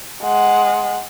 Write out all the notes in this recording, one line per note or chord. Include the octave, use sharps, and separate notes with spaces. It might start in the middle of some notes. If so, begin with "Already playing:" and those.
G#3 F#5